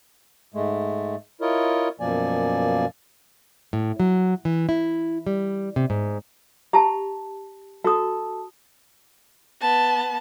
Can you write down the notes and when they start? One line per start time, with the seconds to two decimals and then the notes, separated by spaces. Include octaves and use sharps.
0.54 G#2 G#3 A3
1.41 E4 F4 A#4 C#5 D#5
2.00 F#2 B2 F3 A#3 D5 G#5
3.73 A2
4.00 F#3
4.45 E3
4.69 E4
5.26 G3
5.76 C3
5.90 G#2
6.73 G4 A5 A#5
7.84 F#4 A4 D#6
9.61 B3 A5